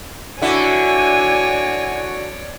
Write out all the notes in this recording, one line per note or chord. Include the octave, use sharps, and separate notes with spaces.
D3 E4 F#4 C#5 D5 G#5